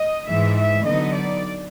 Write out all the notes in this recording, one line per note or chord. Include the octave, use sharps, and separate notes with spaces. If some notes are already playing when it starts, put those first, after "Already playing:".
Already playing: D#5
G#2 E3 G#3 E5
E5
D3 F#3 B3 D#4 D#5
D5